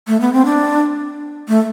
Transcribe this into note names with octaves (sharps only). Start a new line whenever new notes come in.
A3
B3
C4
D4
A3